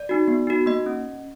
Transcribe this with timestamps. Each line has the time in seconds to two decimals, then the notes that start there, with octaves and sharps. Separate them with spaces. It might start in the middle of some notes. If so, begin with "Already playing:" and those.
Already playing: D5
0.09 D#4 F#4
0.28 B3
0.47 D#4 F#4
0.66 A#3 D#5
0.86 C#4